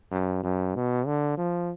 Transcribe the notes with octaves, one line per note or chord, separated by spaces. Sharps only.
F#2
F#2
B2
D3
F3